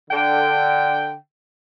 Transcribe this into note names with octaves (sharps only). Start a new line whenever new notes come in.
D3 G5